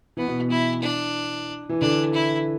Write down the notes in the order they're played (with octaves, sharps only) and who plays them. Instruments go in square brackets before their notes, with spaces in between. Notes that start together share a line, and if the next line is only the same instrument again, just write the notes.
[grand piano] E3 [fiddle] B3
[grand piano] B2
B2
[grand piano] E3 [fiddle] E4
[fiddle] D4
[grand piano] E3
[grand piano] D3 [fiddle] D4
[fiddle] E4